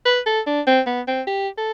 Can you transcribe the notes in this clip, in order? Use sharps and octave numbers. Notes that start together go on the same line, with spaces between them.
B4
A4
D4
C4
B3
C4
G4
A4